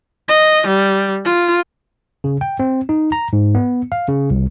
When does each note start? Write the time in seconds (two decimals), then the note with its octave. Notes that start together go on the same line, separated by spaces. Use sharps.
0.28 D#5
0.67 G3
1.24 F4
2.24 C#3
2.41 G5
2.59 C4
2.89 D#4
3.12 A#5
3.33 G#2
3.55 B3
3.92 F5
4.08 C#3
4.30 C2